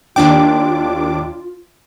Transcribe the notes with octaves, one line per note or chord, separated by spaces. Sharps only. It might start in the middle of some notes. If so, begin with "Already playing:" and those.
D#2 D4 F4 G5 D6